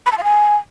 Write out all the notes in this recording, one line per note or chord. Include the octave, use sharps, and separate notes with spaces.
B5
A5
F5
G#5